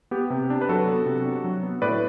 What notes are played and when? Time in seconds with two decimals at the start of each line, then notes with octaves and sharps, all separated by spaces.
0.11 B3 G4
0.30 C3
0.50 D4
0.61 B4
0.69 F#3 F#4 A4
0.88 B3
1.06 C3
1.25 D4
1.44 F#3
1.64 B3
1.82 A2 B4 D5